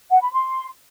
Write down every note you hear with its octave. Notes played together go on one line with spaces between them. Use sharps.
F#5
B5
C6